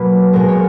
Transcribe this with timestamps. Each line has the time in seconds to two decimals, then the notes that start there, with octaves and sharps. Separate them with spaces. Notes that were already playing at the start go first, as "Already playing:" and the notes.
Already playing: B2 F#3 A#3 B4
0.33 B2 G#3 A#4
0.49 C#5